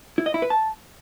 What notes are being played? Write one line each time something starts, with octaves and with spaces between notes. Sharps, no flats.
E4
D#5
E4
B4
A5